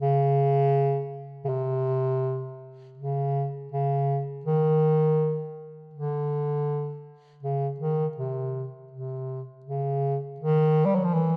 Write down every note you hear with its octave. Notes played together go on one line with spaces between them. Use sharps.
C#3
C#3
C3
C#3
C#3
D#3
D3
C#3
D#3
C3
C3
C#3
D#3
G3
F#3
F3
E3